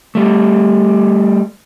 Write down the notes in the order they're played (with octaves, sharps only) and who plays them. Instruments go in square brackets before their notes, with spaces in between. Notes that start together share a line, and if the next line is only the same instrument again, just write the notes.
[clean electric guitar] G3 A3